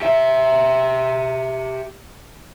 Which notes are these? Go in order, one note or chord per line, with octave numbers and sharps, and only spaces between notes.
G4 E5